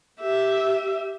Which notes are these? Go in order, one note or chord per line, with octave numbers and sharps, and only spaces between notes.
G4 E5